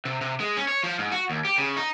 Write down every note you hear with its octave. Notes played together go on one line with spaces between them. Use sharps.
C3
C3
G#3
C#4
C#5
F3
G#2
F#4
D#2
G4
C#3
D#4